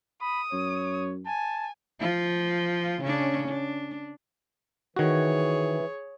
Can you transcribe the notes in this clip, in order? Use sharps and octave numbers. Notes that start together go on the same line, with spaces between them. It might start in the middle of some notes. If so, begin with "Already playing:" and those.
B5 D#6
F#2 C#5
G#5 A5
F3 F4
C#3 C#4 D4
D4
D#3 E3 F#4 G#4 C#5